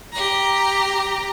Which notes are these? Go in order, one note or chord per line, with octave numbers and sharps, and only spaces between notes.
G4 A#5